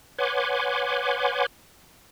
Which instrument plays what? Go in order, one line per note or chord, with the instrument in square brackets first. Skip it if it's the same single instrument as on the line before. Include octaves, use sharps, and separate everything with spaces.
[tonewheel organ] B4 C#5 F#5 G#5 C6 D6